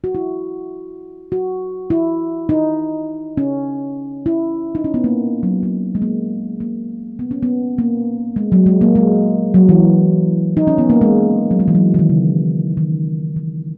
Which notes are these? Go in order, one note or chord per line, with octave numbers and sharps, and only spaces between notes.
F#4
E4
F#4
E4
D#4
C#4
E4
D#4
C#4
B3
A#3
F#3
A#3
G#3
A#3
A#3
B3
C#4
B3
A#3
G#3
F#3
G#3
A#3
G#3
F#3
E3
D#4
C#4
B3
A#3
G#3
F#3
G#3
E3
F#3
E3
D#3
C#3
D#3
E3